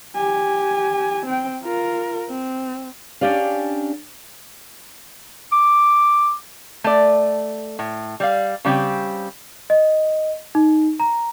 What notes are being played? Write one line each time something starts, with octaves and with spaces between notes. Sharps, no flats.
G4 G#5
C4 G5
F4 A#4
C4
C#4 D4 G4 D5 F5
D6
A3 D5
A2
G3 D5 F5
C#3 G3 C4 G4
D#5
D#4
A#5